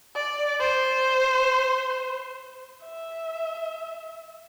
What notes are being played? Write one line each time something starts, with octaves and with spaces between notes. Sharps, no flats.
D5
C5
E5